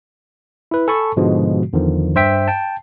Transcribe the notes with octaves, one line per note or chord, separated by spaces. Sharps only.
E4 B4
A4 G#5 A5 B5 C#6
G#2 B2 D3 F3 G#3 F#4
E2 D3 D#3 F3
G2 C5 E5 G5 B6
G5 A5